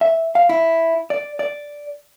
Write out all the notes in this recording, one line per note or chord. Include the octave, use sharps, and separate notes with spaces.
E5
F5
E4
D5
D5